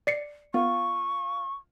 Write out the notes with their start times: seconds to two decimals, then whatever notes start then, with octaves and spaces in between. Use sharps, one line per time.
0.07 D5 C7 C#7
0.54 B3 F4 C#6